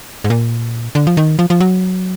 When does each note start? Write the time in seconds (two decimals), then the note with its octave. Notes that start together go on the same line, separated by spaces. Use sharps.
0.24 G#2
0.30 A#2
0.95 D3
1.07 F3
1.17 D#3
1.39 F3
1.50 F3
1.60 F#3